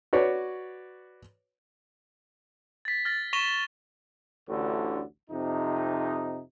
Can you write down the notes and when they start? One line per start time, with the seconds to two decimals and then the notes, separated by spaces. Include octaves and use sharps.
0.13 F#4 B4 C#5 D5
2.85 A6 B6
3.05 F6 A6 A#6
3.33 C#6 A#6 B6 E7 F7 G7
4.49 A1 D2 A2 D3
5.30 F2 C3 D#4